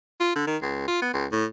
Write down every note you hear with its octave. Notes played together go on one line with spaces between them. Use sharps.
F4
D3
D#3
C#2
F4
B3
C#2
A2